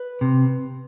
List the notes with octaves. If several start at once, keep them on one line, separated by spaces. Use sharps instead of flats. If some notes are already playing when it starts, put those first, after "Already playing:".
Already playing: B4
C3